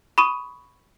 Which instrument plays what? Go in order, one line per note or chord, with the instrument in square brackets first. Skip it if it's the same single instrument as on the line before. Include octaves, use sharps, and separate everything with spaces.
[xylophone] B5 C#6 D#6 D#7